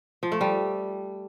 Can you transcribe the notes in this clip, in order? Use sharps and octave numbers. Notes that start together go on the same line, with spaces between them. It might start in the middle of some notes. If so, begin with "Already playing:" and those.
F3
A3
G3